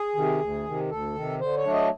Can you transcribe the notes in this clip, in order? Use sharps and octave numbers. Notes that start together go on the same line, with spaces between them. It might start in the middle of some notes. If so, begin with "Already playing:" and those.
Already playing: G#4
C3 D#3
D2
C3 D#3
D2 A4
C3 D#3
D3 C5
C#5
F#3 A3 D4
D#5